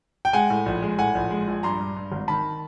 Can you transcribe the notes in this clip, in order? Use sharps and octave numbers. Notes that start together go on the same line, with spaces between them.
G5
G#3 F#5 G#5
A2
A#1
G#3
A2 F#5 G#5
A#1
G#3
A#1
G2 A#5 C6
G2
G2
G#1
D#3 A5 B5